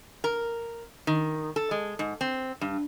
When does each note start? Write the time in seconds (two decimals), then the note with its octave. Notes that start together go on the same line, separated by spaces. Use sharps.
0.24 A#4
1.07 D#3
1.56 A4
1.71 G#3
1.99 G#2
2.21 C4
2.61 G2